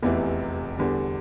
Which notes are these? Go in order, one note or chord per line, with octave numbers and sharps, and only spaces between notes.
F1 E2 C3 E3
E2 D3 G3